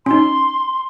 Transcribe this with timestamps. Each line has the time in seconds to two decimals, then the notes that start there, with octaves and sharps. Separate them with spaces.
0.06 C#4 D#4 C6